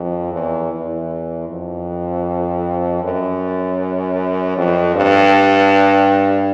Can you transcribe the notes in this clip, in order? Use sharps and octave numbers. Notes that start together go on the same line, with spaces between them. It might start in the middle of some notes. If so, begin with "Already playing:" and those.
Already playing: F2
E2
E2
F2
F#2
F2
G2